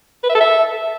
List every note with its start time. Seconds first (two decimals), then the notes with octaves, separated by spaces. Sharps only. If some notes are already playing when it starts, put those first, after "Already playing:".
0.24 B4
0.29 E5
0.35 A4
0.40 E5